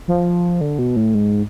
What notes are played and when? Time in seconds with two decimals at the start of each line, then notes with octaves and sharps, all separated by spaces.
0.08 F3
0.61 D3
0.79 B2
0.96 A2
1.15 G#2